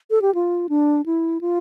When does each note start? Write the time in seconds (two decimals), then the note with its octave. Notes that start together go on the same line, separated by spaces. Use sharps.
0.11 A4
0.22 G4
0.35 F4
0.69 D4
1.06 E4
1.41 F4